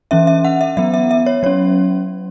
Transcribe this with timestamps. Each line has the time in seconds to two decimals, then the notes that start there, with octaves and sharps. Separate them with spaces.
0.11 E3 C#4 E5
0.27 E5
0.45 F#5
0.61 E5
0.77 F#3 B3 E5
0.94 E5
1.11 E5
1.26 C#5
1.43 F#3 C#5
1.46 C#4